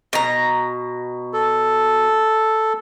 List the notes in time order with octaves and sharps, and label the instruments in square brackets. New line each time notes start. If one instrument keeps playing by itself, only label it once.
[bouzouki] B2 A#5
[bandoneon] A4